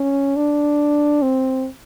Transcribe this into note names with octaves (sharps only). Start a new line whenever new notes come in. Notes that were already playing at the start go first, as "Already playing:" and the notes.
Already playing: C#4
D4
C4